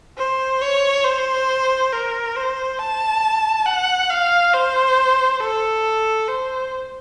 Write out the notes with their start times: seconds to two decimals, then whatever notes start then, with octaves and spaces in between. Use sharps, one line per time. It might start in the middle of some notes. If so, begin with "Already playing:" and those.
0.18 C5
0.62 C#5
1.05 C5
1.92 A#4
2.36 C5
2.79 A5
3.66 F#5
4.10 F5
4.54 C5
5.41 A4
6.28 C5